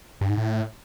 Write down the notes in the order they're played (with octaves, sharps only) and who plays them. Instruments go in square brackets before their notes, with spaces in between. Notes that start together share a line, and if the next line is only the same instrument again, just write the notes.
[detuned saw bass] G2
G#2
A2